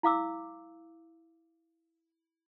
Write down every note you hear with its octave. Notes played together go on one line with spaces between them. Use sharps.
E4 F5 D6 E6